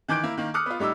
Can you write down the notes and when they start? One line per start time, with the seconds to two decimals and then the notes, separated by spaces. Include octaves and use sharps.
0.08 D#3 E3 D6 G6 D7
0.23 A#3 E4
0.38 D#3 A#3
0.54 D6 D#6 F6 F#6 C#7
0.66 B3 F4
0.79 A2 G3 D#4 D6 E6